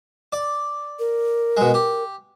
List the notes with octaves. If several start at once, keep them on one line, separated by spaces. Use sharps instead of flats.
D5
A#4
B2 G#3
G4